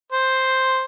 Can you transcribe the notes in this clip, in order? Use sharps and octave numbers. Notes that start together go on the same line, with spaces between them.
C5